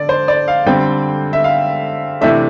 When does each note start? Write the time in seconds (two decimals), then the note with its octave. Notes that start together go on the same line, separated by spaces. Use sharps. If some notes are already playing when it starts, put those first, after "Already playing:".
Already playing: D3 D5
0.09 C5
0.28 D5
0.48 F5
0.66 D3 G3 C4 G5
1.33 E5
1.44 F5
2.21 C3 E3 A3 D4 E5